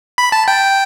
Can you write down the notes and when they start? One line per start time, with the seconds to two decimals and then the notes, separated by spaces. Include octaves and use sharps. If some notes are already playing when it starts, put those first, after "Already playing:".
0.18 B5
0.32 A5
0.48 G5